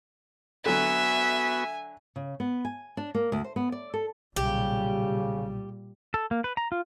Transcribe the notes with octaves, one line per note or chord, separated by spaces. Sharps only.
D3 F#3 B3 F#4 E5 G#5
C#3
B3
G#5
D4
A#3
D2
C5
B3
D5
A4
B1 A#2 C#3 G3 G4
A4
A#3
B4
A#5
F4